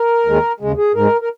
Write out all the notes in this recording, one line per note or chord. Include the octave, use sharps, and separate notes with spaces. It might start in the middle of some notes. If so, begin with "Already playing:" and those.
Already playing: A#4
D#2 D#3 G#3
D#2 C#3 G#3
G#4
G#2 G#3 A#4
A#4